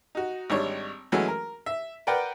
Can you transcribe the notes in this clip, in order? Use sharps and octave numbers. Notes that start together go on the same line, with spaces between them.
D#4 F#4
G#1 G3 D4 C#5
E3 F#3 G#3 A3 C#4 F#4
A#4
E5
A#4 B4 D5 F#5 G5